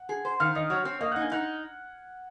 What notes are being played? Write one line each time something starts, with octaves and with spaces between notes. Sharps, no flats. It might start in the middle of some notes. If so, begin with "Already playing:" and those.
Already playing: F#5
G#4
C5
D#3 F5 F6
D#3 D#5 D#6
F#3 C#5 C#6
C4
A#3 D#5 D#6
D#4 F#5 F#6
G#5 G#6
D#4 F#5 F#6